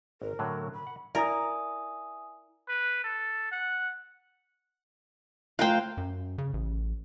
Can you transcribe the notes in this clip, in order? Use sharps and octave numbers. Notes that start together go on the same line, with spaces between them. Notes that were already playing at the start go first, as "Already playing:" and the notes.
G#1 A#4
A2 D3 F#3
B5
F#5
E4 A#4 D5 E5 G#5 D#6
B4
A4
F#5
A3 F4 A#4 C5 F5 G5 A#5 F#6
F#2
C#3
A1